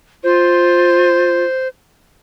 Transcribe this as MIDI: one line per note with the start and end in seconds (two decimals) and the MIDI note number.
0.23 1.44 65
0.23 1.68 72